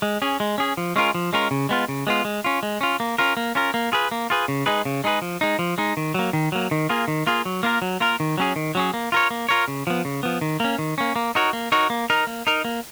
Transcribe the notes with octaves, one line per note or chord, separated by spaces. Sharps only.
G#3
C#4 G#4
G#3
C#4 G#4
F3
G#3 C#4 F4 A#4
F3
G#3 C#4 F4 A#4
C#3
G#3 B3 F4
C#3
G#3 B3 F4
G#3
C#4 F4
G#3
C#4 F4
A#3
C#4 F4 A#4
A#3
C#4 F4 A#4
A#3
F4 G#4 B4
A#3
F4 G#4 B4
C#3
G#3 D#4 G#4 B4
C#3
G#3 D#4 G#4 B4
F3
G#3 D#4
F3
G#3 D#4
D#3
F#3 A#3
D#3
F#3 A#3
D#3
A#3 F4 G#4
D#3
A#3 F4 G#4
F#3
A#3 F4 A#4
F#3
A#3 F4 A#4
D#3
F#3 C#4 G#4
D#3
F#3 C#4 G#4
A#3
F4 A#4 C#5
A#3
F4 A#4 C#5
C#3
F3 B3
C#3
F3 B3
D#3
A#3 C#4
D#3
A#3 C#4
A#3
D#4 F#4 A#4 C#5
A#3
D#4 F#4 A#4 C#5
A#3
D#4 A#4
A#3
D#4 A#4
A#3